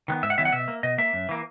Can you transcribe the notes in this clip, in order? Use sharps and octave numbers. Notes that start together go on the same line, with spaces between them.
D#3 F#3 B3
G#2 E5
F#5
D#3 F#3 B3 E5
F#5
B2 E5
A#3
B2 D#5
A#3 E5
F#2
E3 A#3